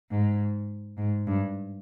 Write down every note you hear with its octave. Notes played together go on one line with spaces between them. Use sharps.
G#2
G#2
G2